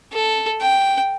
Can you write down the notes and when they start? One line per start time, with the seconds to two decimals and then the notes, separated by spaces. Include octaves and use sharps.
0.13 A4
0.61 G5